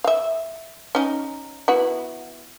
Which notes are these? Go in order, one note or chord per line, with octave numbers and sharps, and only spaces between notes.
E5 F5
C#4 D#4
B3 E4 F#4